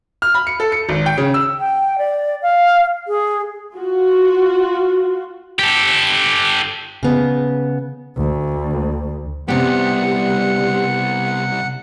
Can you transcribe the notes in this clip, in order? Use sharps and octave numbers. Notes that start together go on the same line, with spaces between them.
F6
B5
C#7
A4
C#7
G#1
G5
C#3
E6
G5
D5
F5
G#4
F4 F#4
G4 A4
C#3 B3
D2
C2 C3 G3 B3 G4 F#5